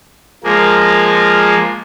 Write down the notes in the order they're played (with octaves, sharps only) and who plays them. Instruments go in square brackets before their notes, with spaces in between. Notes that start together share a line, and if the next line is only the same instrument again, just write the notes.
[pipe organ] F3 G#3 A#3